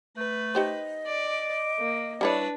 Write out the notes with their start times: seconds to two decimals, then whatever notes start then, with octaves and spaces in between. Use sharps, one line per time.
0.17 A3 B4
0.55 D#4 G4 C5 D#5
1.06 D5 D6
1.79 A#3
2.21 G3 D4 E4 B4 C#5